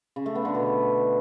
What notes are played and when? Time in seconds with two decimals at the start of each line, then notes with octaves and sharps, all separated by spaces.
0.16 C#3
0.26 A3
0.35 B3
0.45 D3
0.55 B2